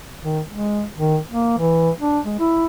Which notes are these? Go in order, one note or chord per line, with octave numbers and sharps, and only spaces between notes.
D#3
G#3
D#3
A#3
E3
D4
G#3
E4